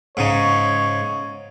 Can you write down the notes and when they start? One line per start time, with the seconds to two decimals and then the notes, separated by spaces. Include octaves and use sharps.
0.17 G#2 C#3 D#4 C#5